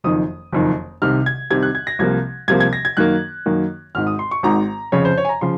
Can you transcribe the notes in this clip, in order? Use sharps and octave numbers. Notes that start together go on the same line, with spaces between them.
F#1 F2 D#3 D#6
F#1 F2 D#3
C2 C3 D#3 F6
G#6
C2 C3 D#3 G#6
F#6
G#6
A#6
C2 C3 F3 A#3 G#6
C2 C3 F3 A#3 G#6
G#6
A#6
G#6
F#2 D#3 A#3 F#6
F#2 D#3 A#3
G#1 G#2 D#3 F6
D#6
C6
C#6
G#1 G#2 D#3 A#5
F2 C#3 F3 C#5
C5
C#5
G#5
A#5
C#3 F3 C6